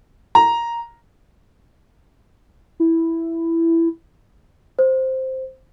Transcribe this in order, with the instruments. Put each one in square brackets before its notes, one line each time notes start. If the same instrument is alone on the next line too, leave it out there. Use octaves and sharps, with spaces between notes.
[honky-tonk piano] A#5
[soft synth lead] E4
[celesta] C5